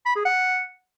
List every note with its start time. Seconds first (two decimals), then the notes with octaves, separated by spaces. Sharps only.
0.06 B5
0.16 G#4
0.25 F#5